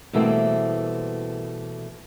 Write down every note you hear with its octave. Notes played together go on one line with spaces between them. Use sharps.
B2 E3 G3 A3 A#3 C4